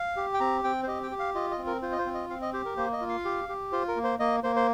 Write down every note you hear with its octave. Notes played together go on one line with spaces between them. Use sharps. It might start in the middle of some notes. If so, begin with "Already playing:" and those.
Already playing: F5
G4
G5
C4 A#5
C4 G5
C5
G4 D#5
G5
G4
F5
F4 D#5
D#5
C4
A#4
F4 C5
D#5
C5
C4
D#5
C4 F5
D#5
G4 C5
A#4
A#3 C5
D#5
F4
F5
G4
G4
F4 C5
A#4
A#3
C5
A#3 D#5
A#3 C5
C5